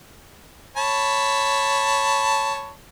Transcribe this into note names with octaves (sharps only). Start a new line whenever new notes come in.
C#5 A5 B5